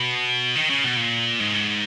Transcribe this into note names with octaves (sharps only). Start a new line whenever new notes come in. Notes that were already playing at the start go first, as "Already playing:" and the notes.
Already playing: B2
D#3
C#3
B2
A#2
G#2